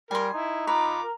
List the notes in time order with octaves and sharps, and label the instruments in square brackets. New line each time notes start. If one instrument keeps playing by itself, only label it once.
[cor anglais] G3 [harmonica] A#4 [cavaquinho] G#5 C6
[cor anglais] D#4 [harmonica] E4
[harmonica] F4 D6 [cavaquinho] B4 [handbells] A#5
[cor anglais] A#4